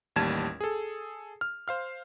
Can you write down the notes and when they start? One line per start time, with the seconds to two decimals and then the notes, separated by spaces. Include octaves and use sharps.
0.16 A1 D#2 G3 A5 G#6 E7
0.60 G#4 A4
1.41 F6
1.68 C5 F5 F6